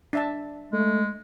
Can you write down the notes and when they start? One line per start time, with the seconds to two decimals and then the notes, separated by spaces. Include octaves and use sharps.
0.13 D4 E5 A5
0.73 G#3 A3